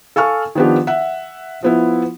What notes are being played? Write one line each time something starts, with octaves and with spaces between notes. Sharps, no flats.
A4 F5 G#5 C#6 F6
D#3 F3 B3 D4 G4
E5 F#5
F3 B3 E4